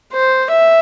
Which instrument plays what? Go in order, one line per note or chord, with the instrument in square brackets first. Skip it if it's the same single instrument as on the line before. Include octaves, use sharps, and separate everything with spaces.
[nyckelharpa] C5
E5